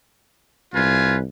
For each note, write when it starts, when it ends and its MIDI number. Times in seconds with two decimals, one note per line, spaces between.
0.74 1.24 36
0.74 1.17 65
0.74 1.17 71
0.74 1.17 80